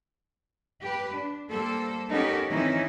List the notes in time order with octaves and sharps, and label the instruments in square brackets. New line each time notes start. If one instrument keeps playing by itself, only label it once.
[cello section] G4 B4
D4
G3 A#3 A4 C5
B3 C#4 D#4 G4 A4 A#4
D#3 E3 C4 C#4 D#4 E4